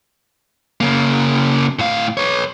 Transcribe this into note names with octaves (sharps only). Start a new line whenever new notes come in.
C#3 A#3
A2 F5
B4 C#5